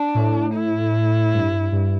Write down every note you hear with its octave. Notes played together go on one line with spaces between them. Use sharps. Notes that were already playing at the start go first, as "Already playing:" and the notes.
Already playing: D4
A2
E4
G2
G2